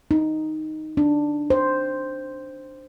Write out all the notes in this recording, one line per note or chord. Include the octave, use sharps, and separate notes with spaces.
D#4
D4
C5